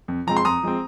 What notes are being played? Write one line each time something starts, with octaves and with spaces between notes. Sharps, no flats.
F2
F3 G#3 C4 A#5
C6
F2 A#5 D#6
F3 G#3 C4